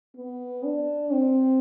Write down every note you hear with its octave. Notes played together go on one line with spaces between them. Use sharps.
B3
D4
C4